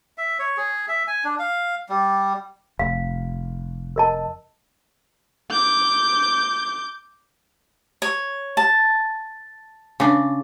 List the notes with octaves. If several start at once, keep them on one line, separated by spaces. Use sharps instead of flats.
E5
C#5
G#4
E5
G#5
D4
F5
G3
F1 F5
A#4 D#5 A5
D6 G6
C#5
A5
C#3 D4